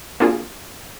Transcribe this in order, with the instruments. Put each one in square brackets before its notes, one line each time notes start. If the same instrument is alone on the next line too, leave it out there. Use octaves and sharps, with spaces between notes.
[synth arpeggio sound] A#3 C4 D4 F4 F#4 G#4